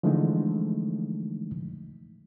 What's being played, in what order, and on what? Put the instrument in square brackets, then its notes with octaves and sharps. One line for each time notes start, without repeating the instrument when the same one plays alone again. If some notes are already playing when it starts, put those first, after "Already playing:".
[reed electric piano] D3 E3 F3 G#3 A3 D#4